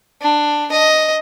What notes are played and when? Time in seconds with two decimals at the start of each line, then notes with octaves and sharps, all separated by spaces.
0.21 D4
0.71 D#5